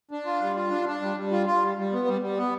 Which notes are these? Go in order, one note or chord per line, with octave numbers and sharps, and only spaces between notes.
D4
F4
G3
F4
D4
D4
G3
G3
F4
F4
G3
G3
B3
G3
G3
B3